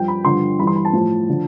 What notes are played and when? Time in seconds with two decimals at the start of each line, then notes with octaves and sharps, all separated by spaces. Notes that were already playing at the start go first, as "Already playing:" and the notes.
Already playing: G2 F3 G5
0.08 B5
0.24 G2 D3 F3 C6
0.59 G2 E3 B5
0.67 C6
0.76 B5
0.85 A5
0.93 A2 F3
1.29 D3 F3